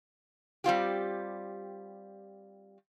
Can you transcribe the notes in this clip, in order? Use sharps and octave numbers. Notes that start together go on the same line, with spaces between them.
G3 C4 F4 G4